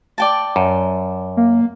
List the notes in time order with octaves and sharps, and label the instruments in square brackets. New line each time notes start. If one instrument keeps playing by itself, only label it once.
[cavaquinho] D5 G5 A5
[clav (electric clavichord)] F#2
[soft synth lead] A#3